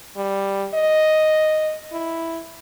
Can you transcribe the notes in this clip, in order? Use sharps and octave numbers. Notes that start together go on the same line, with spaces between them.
G3
D#5
E4